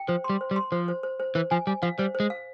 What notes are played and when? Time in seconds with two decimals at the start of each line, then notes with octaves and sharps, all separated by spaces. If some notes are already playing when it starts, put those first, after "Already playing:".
Already playing: G5
0.08 F3 C5
0.24 C6
0.30 G3
0.41 C5
0.51 G3
0.56 C6
0.72 F3 C5
0.88 C5
1.03 C5
1.20 C5
1.35 E3 C5
1.51 F3 G#5
1.67 G3 G#5
1.82 F3 F5
1.98 G3 C5
2.15 C5
2.20 G#3
2.30 F5